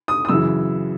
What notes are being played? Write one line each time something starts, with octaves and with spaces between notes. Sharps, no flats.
D#6
D#6
F#2 C#3 E3 E6